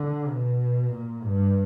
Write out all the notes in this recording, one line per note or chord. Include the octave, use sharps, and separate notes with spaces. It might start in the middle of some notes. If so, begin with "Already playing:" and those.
Already playing: D3
B2
A#2
G2